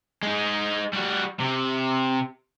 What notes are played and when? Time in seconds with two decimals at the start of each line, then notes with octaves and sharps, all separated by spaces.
0.23 G#3 D#4
0.93 G3 F#4
1.40 C3